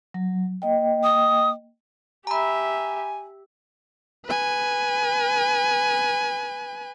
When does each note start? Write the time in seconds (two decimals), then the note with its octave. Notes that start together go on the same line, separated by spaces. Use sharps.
0.14 F#3
0.62 A#3 D#5 G5
1.03 D#6
2.27 G4 E5 G#5 A#5 B5
4.26 B4 G#5